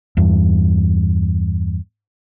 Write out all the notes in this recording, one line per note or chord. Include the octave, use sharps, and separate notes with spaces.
E2 G2